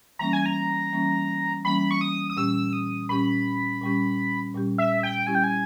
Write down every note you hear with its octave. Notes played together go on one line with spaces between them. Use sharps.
E3 G3 A#3 C#4 A#5
G#5
A#5
E3 G3 A#3 C#4
E3 G3 A#3 C#4 B5
C#6
D#6
D#6
A#2 G3 C#4 G4 E6
D#6
A#2 G3 C#4 G4 B5
A#2 G3 C#4 G4
A#2 G3 C#4 G4
E5
G5
G3 C#4 E4 G4 G#5
G5
G#5